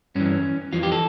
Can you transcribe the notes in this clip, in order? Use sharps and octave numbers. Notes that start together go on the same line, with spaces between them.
G2 E3 C#4
F2 E3 F4
G4
A4